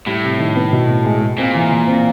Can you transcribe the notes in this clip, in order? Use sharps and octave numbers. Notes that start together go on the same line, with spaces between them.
A2 G3
C3
D#3
B3
B2
B3
G#3
G#3
A#2 C4
E3
E3
C4